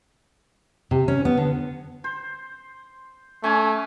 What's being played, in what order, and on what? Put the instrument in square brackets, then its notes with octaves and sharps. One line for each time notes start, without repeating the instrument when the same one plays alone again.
[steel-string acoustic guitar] C3
C#4
B3
D3
[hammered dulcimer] C5
[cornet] A3 [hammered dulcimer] C#4 G#5 C6